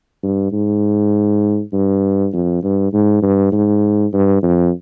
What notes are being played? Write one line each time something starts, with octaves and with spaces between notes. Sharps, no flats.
G2
G#2
G2
F2
G2
G#2
G2
G#2
G2
F2